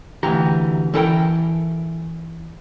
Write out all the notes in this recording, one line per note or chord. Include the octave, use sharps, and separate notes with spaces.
D2 E3 G4 A#5
E3 E4 A4 A#4 G5